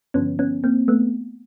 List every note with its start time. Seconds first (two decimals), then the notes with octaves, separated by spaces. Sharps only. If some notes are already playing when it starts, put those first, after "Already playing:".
0.14 G2 D3 F3 B3 C#4
0.39 B3 C#4
0.64 A#3 C4
0.88 A3 B3